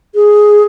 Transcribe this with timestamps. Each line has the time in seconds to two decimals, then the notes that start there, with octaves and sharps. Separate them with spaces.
0.15 G#4